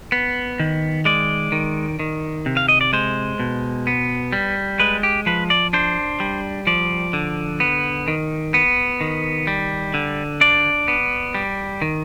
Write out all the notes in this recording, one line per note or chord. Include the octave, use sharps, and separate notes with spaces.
B3
D#3
G#3 D5
D#3
D#3
C3
F5
D#5
D5
G#3 C5
B2
B3
G3
G#3 B4
G4
F3 B4
D5
D4 C5
G3
F3 D5
D3
B3
D#3
B3
D#3
G3
D3
D4 D5
B3
G3
D#3